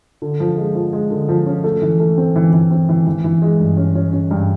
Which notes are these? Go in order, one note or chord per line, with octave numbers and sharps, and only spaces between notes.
D3
F3
G#3
F3
G#3
D3
F3
C#4
A3
E3
A3
C4
E3
E3
C4
E3
E3
E3
G#3
G2
C#4
C#4
C#4
G2